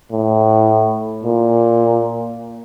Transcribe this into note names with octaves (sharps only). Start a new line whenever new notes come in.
A2
A#2